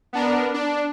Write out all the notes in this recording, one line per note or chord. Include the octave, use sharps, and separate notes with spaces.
B3 D4 A#4
D4